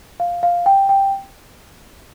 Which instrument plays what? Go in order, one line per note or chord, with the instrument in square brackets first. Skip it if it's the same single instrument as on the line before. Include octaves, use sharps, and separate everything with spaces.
[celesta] F5
F5
G5
G5